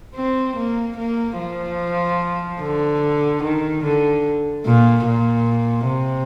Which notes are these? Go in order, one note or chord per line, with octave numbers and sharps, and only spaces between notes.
C4
A#3
A#3
F3
D3
D#3
D3
A#2
A#2
C3